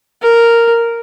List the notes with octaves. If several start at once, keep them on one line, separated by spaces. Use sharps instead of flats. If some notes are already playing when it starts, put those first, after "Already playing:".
A#4